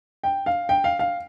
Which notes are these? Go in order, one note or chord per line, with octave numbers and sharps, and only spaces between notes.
G5
F5
G5
F5
F5